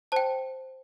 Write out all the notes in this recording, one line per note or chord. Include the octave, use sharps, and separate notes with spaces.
C5 G5 A5